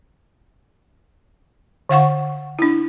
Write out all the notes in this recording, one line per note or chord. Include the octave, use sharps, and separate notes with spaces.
D3 F5 F#5 C#6
D4 E4